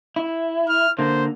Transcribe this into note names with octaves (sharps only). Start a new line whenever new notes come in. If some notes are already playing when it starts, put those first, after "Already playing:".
E4
F6
D3 A#3 C5